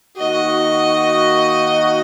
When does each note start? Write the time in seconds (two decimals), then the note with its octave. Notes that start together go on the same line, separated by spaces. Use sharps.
0.17 D#3 A#3 D#4 F#4 D#5